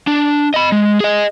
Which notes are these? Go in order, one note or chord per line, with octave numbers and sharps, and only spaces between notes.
D4
D#5 B5
G#3
G#4 D#5